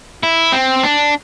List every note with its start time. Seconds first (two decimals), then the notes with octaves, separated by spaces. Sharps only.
0.23 E4
0.52 C4
0.83 D4